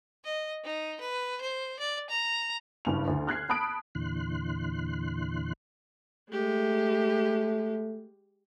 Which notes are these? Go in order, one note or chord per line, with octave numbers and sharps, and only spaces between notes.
D#5
D#4
B4
C5
D5
A#5
F#1 G2 F7
D2
F6 F#6 G#6 C7
A5 B5 D#6 F#6 D7
E2 A#2 D3 E3 C6 F#6
G#3 A3 G4